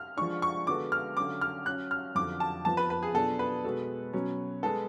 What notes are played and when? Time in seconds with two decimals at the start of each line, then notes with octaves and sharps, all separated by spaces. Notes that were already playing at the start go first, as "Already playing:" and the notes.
Already playing: F6
0.17 F3 G#3 D4 C#6
0.42 C#6
0.67 D3 G#3 B3 F#4 A4 D6
0.92 F6
1.17 D3 F#3 C#4 D6
1.41 F6
1.66 F#3 C#4 F#4 F#6
1.91 F6
2.15 F2 D3 F#3 D6
2.40 A5
2.65 F2 F3 B3 F4 A5
2.77 B4
2.90 B4
3.03 G#4
3.14 B2 F#3 B3 D4 F4 A4
3.39 B4
3.64 B2 G#3 B3 F#4 A4
4.13 B2 F#3 C#4
4.63 G#3 B3 A4